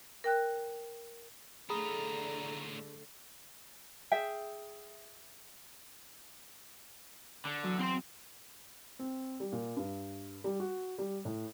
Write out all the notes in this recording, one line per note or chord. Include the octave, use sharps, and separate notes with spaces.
A#4 G5 F#6
A2 D3 A3 F4 G#4 A#5 B5 D#6
G#4 E5 G5
D3
E2 F#3 B4
C4 C6
C4
G3
A#2
G2
G3
F#4
G3
A2